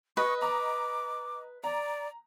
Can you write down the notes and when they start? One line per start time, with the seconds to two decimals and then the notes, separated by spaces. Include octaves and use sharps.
0.17 B4 D#5 C#6
0.42 D#5 A#5 D6
1.64 D5 A#5